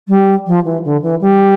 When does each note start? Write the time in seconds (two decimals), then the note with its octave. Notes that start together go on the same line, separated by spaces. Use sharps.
0.08 G3
0.46 F3
0.64 E3
0.84 D3
1.02 E3
1.21 G3